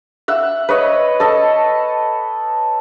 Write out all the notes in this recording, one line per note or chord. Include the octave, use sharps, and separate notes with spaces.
E5 F#5
B4 C#5 D#5
A4 D#5